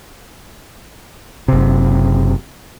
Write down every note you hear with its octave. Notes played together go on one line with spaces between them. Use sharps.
F#1 C3